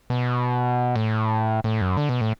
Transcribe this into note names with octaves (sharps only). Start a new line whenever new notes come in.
B2
A2
A2
F#2
D3
B2
A2